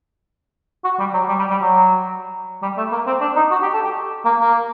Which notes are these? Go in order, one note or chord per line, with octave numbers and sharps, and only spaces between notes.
F#4
G3
F#3
G3
G3
G3
F#3
G3
A3
A#3
C4
D4
D#4
F#4
G4
A4
G4
A#3
A#3